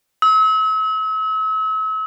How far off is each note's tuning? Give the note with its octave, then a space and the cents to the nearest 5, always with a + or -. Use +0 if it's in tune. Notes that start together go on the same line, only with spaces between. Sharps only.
E6 -40